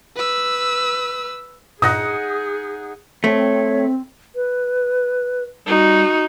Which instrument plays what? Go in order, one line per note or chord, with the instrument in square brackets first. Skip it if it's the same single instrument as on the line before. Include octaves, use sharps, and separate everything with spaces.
[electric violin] B4 E6
[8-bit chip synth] G2 A#2 [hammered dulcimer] D#4 F#5 [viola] G#4 [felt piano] D#6 A#6
[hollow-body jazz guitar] A3 [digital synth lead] C4 [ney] C#5
[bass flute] B4
[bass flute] G3 [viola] D#4 F#4